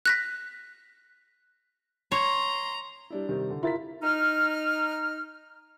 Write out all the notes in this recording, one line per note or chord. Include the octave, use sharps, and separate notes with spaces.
F#6 A#6 B6
C#5 A#5 C6
G3 D4 E4
C3 D#3 G3
D3 E3
E4 F4 A#4 A6 B6
D#4 F6